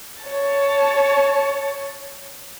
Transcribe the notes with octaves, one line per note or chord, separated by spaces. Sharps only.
C#5 A5